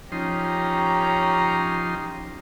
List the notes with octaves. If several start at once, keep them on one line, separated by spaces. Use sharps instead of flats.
F3 C#4 D#4 G4 A#5 C6